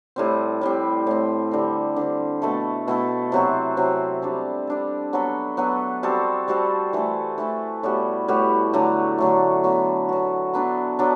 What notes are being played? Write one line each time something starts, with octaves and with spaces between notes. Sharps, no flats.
A2 G3 C4
A2 G3 C4
A2 G3 C4
D3 G3 C4
D3 G3 C4
B2 A3 E4 A4
B2 A3 E4 A4
C3 F#3 C4 F#4
C3 F#3 C4 F#4
G3 D4 A4
G3 D4 A4
F#3 B3 F#4 A4
F#3 B3 F#4 A4
G3 C4 F#4 A4
G3 C4 F#4 A4
E3 A3 E4 A4
E3 A3 E4 A4
A2 G3 B3 F#4
A2 G3 B3 F#4
D3 F#3 A3
D3 F#3 A3
F#3 B3 F#4
F#3 B3 F#4
F#3 B3 D4 A4
F#3 B3 D4 A4